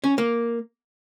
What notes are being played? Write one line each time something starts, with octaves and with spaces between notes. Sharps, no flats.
C#4
A#3